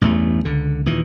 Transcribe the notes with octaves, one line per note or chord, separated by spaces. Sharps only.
A1 E2 G2 A3
C#2 D3
D#2 A#2 E3